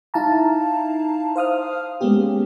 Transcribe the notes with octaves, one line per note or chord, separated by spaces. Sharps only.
D#4 E4 F5 A5 A#5
C5 F5 D#6 F6
G#3 A#3 B3 C#4 G4